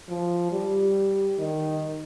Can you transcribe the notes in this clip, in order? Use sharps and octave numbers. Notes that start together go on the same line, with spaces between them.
F3
G3
D#3